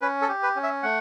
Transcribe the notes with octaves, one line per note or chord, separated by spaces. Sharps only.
C#4 B4
A4
G4
B4
C#4
E5
A3 F#5